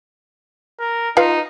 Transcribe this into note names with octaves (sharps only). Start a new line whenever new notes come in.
A#4
D#4 F4 B4 F5